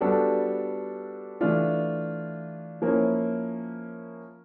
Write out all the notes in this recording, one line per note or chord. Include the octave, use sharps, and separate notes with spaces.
G3 B3 D4 F#4 A4
E3 A3 D4 F4
F3 A#3 C#4 E4